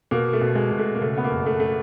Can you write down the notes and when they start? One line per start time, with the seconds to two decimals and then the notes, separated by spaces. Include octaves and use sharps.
0.11 B2 A#3
0.33 A3
0.41 B2
0.55 G#3
0.72 B2
0.79 A3
0.95 A#3
1.01 C#3 A3
1.18 B3
1.24 A#3
1.31 F#1
1.46 A3
1.60 A3